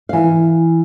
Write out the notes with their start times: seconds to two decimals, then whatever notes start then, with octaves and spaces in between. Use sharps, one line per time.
0.09 E3 F5